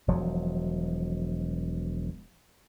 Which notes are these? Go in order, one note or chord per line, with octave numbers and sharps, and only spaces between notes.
E1 F3 F#3